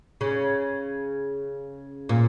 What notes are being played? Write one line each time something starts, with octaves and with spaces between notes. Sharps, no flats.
C#3
A#2